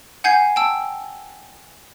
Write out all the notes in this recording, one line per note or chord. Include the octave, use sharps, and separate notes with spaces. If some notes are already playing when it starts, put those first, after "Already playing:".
F#5 G#5 G6 G#6 C7
G5 A5 E6